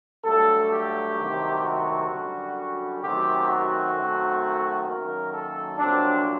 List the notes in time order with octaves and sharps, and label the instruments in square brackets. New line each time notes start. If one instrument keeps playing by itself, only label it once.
[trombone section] G2 F#3 A3 A4
G4
C2 C3 D#3 F#3 A3
F#4
F#2 D3 G3
F#2 D#3 F#3 A3 C4 G4
F#4
F#2 D#3 A3 C4
F#2 D#3 F#3 A#3 A#4
A4
C2 A#2 F#3 C4 D4